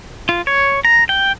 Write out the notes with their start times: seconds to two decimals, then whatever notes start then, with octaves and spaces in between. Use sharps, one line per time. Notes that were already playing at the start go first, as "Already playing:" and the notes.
0.29 F4
0.47 C#5
0.85 A#5
1.09 G5